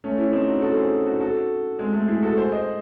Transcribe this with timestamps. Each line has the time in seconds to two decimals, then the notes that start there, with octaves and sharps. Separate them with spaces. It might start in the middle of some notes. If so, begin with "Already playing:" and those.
0.04 A3 C#4
0.18 C#4 E4
0.33 C4 D#4
0.48 D#4 F#4
0.62 F#4 A4
0.77 G#4 C5
1.06 D#4 F#4
1.20 F#4 A4
1.79 G#3 C4
1.93 A3
2.08 E4 G#4
2.23 F#4 A4
2.37 G#4 C5
2.52 C5 D#5